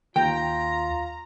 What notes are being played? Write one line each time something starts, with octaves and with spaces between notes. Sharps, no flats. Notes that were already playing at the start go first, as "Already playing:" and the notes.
D#2 F4 G5 A#5